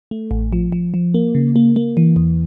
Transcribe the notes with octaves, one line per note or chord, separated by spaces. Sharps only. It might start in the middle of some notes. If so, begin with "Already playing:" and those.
A3
A1
F3
F3
F3
A#3
C#3
A#3
A#3
E3
E2